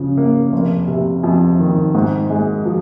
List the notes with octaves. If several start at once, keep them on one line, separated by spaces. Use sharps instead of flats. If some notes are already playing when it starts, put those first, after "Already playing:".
Already playing: C#3 F3
A#3
F1
C3
F2
D#3
G#2
G#3
F3